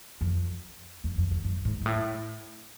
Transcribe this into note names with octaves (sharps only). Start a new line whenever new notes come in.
F2
E2
F2
F2
F#2
G#2
G#2
A2